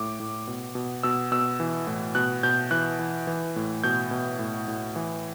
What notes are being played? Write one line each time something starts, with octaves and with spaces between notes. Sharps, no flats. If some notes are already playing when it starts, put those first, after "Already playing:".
Already playing: A2 D6
A2
B2
B2
B2 E6
B2 E6
E3
A2
B2 F#6
B2 G6
E3 F#6
E3
E3
A2
B2 G6
B2
A2
A2
E3